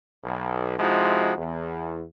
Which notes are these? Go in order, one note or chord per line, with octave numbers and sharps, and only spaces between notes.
B1
C3 F3 G#3 D#4 E4 F#4
E2